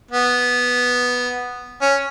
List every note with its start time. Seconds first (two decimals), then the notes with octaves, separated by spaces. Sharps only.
0.11 B3
1.81 C#4